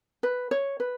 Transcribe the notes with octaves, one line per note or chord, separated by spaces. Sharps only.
B4
C#5
B4